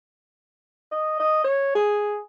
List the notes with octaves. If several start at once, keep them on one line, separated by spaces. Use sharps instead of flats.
D#5
D#5
C#5
G#4